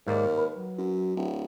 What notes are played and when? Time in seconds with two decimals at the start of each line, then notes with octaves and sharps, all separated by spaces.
0.07 D#2 G#2 A#3 A#4 D5
0.38 B4
0.55 F#3
0.78 F#2
1.16 D1